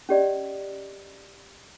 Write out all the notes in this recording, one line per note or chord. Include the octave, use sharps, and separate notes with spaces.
C#4 G4 D5 D#5